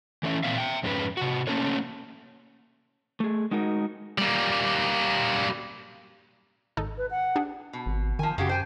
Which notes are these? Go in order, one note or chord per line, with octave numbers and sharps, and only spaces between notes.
E3 A3 C#4 E5
A#2 C4 E5 F5
E5 G5
F2 G#2 G#3 C#4 F#4 B4
C3 F#4
A3 A#3 C#4 A4 A#4 C#5
A3 G#4
G#3 D#4 F#4 A#4
G3 A#3
G#1 D#4 A4
B4
F#5
D4 G4 G#4
B2
G#1
D#3 F3 G#5
F#2 C#3 F#4 G4
C5 G5 G#5